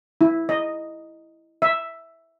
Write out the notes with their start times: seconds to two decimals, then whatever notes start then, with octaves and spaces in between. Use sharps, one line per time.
0.21 E4
0.49 D#5
1.62 E5